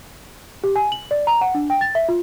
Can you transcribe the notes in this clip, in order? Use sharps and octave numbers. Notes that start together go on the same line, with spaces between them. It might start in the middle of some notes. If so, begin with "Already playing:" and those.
G4
G#5
F#7
D5
A#5
F#5
D4
G5
A6
E5
F4